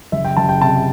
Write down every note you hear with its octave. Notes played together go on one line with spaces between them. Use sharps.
F#1 E5
G5
F#1 A5
G5
C3 A5